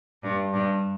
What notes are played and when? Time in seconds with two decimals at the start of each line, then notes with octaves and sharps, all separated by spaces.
0.23 G2
0.54 G2